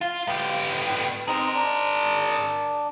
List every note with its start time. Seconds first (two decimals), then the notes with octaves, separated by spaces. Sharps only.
0.01 F4
0.28 B3 G4
1.28 C4 D#4 G#4 A#4 A#5
1.55 D4